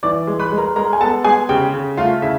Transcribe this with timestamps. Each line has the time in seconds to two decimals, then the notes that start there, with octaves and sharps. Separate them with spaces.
0.03 E3 D5 D6
0.27 G#3
0.39 B4 B5
0.52 G#3
0.58 A#4 A#5
0.76 G#3 A#4 A#5
0.93 G#5
1.00 B3 A4 A5
1.24 G#3 G#4 G#5
1.49 C#3 G4 G5
1.74 C#3
1.97 A3 F4 F5
2.22 C#3 E4 E5